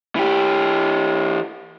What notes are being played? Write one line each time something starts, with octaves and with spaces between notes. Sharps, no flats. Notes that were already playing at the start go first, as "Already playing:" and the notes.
E3 G4